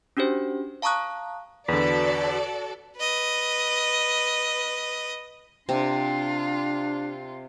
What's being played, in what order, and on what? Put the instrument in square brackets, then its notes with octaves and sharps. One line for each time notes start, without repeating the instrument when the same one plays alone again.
[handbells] C#4 D4 F#4 G4 C5
F5 A5 A#5 C#6 D#6 F#6
[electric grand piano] E2 D3 [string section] F#4 A4 D5 [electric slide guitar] B4
[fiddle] B4 D#5
[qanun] C3 [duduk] D4 [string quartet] F4